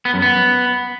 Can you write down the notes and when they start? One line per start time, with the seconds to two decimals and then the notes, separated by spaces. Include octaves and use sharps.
0.05 B3
0.14 F#2
0.22 B3